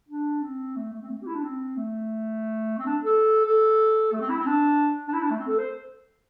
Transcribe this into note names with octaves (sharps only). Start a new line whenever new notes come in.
D4
C4
A3
A3
C4
A3
C4
G4
E4
D4
C4
A3
C4
D4
A4
A4
A3
C4
E4
C4
D4
D4
E4
D4
A3
C4
A4
C5